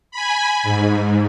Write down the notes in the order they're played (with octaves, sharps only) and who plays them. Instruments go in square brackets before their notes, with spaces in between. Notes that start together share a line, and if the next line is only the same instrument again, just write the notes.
[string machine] G#5 B5
G#2